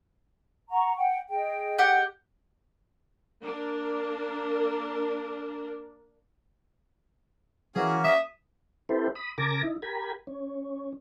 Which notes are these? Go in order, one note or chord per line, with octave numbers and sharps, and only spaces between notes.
F#5 A#5 C#6
F#5 G5
G#4 D#5 G5
G4 F#5
A#3 D4 A#4
E3 A#3 C#4 F#4 G#4
E5 D#6
C4 E4 G4 A4 B4 C5
B5 D#6
C#3 A#4 G#5 A5 D6 A#6
D#4 E4
G4 A#4 G#5 B5
C#4